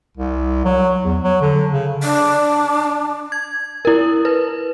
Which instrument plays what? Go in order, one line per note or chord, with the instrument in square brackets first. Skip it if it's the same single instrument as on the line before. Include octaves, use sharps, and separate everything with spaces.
[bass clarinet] C2
F#3
E2
F#3
D3
C#3
[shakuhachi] D4
[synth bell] G#6
E4 A#4
B4